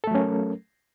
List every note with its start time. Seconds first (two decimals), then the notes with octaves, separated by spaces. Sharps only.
0.04 A4
0.07 A3
0.11 F#3
0.15 C#4
0.18 A#4